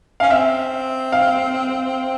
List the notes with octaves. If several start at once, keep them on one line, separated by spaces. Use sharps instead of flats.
C#4 F5
C4 E5
F5